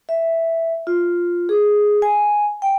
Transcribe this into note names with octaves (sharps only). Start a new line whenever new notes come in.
E5
F4
G#4
G#5
G5